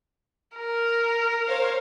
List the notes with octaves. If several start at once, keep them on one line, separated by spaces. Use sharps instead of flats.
A#4
C5 C#5 F5